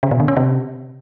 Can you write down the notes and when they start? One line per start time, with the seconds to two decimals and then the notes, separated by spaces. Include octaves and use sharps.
0.03 C#3
0.11 B2
0.20 D3
0.28 C#4
0.37 C3